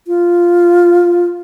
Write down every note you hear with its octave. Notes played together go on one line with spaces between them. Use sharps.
F4